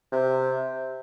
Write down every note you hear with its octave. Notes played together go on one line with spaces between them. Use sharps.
C3